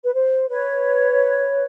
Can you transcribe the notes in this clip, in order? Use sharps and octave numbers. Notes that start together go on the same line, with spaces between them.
B4
C5
B4 C#5